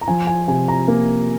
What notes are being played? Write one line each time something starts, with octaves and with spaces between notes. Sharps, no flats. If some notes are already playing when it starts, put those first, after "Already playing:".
A#5
F3 G#5
G#5
C3 G#5
A#5
A#3